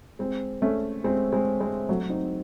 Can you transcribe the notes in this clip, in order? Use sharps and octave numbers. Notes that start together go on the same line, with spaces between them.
G#3 C4
A3 C#4
G#3 C4
G#3 C4
G#3 C4
F#3 A3
C4 D#4